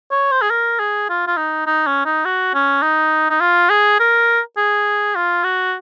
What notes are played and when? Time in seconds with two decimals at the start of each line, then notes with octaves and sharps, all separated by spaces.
0.11 C#5
0.32 C5
0.42 G#4
0.50 A#4
0.79 G#4
1.09 F4
1.27 F4
1.37 D#4
1.67 D#4
1.86 C#4
2.05 D#4
2.25 F#4
2.54 C#4
2.82 D#4
3.30 D#4
3.40 F4
3.70 G#4
4.00 A#4
4.57 G#4
5.15 F4
5.44 F#4